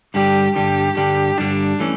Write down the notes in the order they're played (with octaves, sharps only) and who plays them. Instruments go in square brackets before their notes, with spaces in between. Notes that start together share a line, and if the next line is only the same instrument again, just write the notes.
[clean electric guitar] G2 D3 G3 [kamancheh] G4
[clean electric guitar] G2 D3 G3 [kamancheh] G4
[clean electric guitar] G2 D3 G3 [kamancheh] G4
[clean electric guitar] G2 D3 G3 [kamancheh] D4
[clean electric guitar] E3 A3 C#4